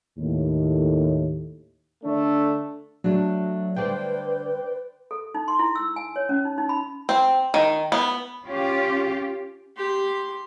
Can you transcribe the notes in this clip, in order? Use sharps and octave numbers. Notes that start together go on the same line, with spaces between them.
D#2 A2
D3 A3 D4
F#3 A3 D4
D3 G3 B4 C5 D5 G5
A4
D#4
C6
E4
E6
G#5
C#5
C#4
D#4
D#4
B5
C4
D#3
B3
C#4 F4 G4
G4 C6